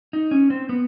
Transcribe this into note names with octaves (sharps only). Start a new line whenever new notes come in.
D#4
C#4
C4
B3